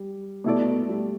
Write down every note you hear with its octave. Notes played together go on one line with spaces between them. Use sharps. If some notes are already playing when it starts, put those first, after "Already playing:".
Already playing: G3
B2 A3 E4 A4 D5
A3
G3